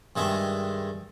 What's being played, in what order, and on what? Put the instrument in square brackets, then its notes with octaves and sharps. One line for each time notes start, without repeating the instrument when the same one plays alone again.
[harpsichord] G2 D#3 G#3 E5